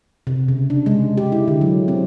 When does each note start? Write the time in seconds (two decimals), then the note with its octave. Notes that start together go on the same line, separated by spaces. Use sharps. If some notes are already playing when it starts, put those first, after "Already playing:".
0.27 C3
0.48 C#3
0.70 D4
0.86 G#3
1.17 G4
1.32 E4
1.48 D3
1.61 F#3
1.88 C4